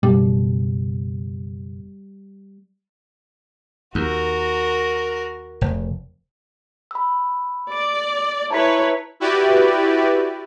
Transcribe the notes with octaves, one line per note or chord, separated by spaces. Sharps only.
F#1 B2 G3
D#2 F#4 A#4
F1
B5 E6
D5 D7
E4 B4 C#5 A5 A#5 B6
E4 F#4 G4 B4 D5